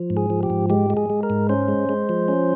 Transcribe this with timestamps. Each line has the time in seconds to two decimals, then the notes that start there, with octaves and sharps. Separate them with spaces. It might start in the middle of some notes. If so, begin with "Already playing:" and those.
Already playing: F3
0.10 G#2
0.17 G#4
0.30 F3
0.43 G4
0.50 G#2
0.70 G#3 G4
0.90 G#3
0.97 G#4
1.10 G#3
1.23 A#4
1.30 G#2
1.49 C#4 C5
1.68 G#3
1.89 G#3
2.09 F3
2.28 C#4